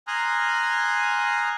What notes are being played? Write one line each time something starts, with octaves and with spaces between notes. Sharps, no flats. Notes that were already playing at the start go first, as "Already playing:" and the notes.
G#5 A#5 C6 D#6 F6 F#6